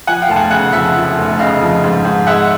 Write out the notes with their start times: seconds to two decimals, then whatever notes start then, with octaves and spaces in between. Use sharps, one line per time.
0.07 F3 F#5 G#5
0.22 F5 G5
0.29 F1 A5
0.36 F#5 G#5
0.51 C#3 F#5 G#5
0.73 F2 E5 F#5
0.95 F3
1.18 F1
1.39 C#3 D#5 F5
1.61 F2
1.84 G#2
2.05 G#2
2.27 G#3 E5 F#5